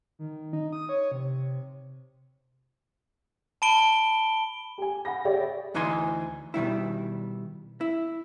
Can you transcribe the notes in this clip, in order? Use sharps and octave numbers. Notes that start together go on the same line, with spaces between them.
D#3
D#4
D#6
C#5
C3
A5 B5 D7 G7
G4 G#5
F#5 B5 A#6
G4 G#4 C#5 D5 E5 G5
D2 E3 D#4 D#5 G#5 C6
B2 D#3 G3 E4
E4